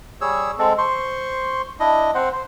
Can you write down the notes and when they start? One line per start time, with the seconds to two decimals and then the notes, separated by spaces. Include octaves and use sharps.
0.21 G3 G#4 C#5 E6
0.58 G#3 C4 A4
0.78 C5 C6 C#6
1.80 D4 E4 D#5
2.14 C4 C5 F#5
2.32 C5